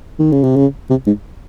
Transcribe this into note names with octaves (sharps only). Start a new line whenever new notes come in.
D#3
C#3
C3
C#3
C3
G#2